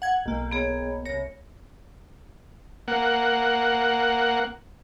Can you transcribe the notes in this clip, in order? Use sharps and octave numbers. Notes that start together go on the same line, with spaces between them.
F#5 G#6
B1 A#3
B3 G#4 C#5
C2 C#5 A#6
A#3 F#5